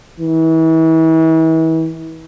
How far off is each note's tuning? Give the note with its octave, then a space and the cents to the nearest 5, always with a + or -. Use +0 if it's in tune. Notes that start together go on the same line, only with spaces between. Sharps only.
E3 -35